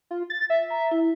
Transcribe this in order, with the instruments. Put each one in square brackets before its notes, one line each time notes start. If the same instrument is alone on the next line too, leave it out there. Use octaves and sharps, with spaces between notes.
[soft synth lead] F4
A6
E5
[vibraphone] A#5
E4